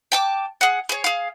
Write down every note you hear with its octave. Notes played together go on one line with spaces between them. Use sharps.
G5 A5 D6
G#4 F#5
G#4 C#5
G#4 F5